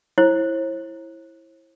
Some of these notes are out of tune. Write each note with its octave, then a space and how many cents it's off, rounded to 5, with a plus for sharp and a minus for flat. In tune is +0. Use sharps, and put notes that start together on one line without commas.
E4 +0 C5 +45